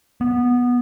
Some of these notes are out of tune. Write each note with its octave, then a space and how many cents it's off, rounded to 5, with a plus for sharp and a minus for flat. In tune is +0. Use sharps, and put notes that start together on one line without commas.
B3 -10